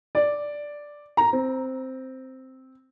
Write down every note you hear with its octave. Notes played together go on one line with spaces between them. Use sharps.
D5
A#5
C4